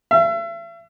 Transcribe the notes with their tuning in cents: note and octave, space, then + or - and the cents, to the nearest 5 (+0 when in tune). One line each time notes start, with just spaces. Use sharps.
E5 +40